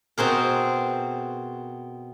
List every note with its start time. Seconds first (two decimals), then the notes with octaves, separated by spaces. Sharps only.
0.18 B2 C4 G#4 A#4